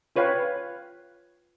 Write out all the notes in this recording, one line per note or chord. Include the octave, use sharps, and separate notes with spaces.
F4 B4 C#5 F5 G5